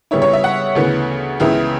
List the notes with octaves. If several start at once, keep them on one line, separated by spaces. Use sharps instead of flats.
C#3 G3 B3 E4 C#5
C#5
E5
F#5
D2 C#3 E3 B3
C#2 C#3 E3 B3 E4